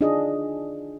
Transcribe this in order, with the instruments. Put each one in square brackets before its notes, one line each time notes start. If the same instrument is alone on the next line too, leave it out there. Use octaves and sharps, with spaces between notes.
[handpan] D4 D#4 F4 G#4 D#5